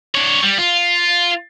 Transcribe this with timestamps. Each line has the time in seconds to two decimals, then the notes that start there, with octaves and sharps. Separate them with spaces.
0.15 D4 C#5
0.43 G3
0.59 F4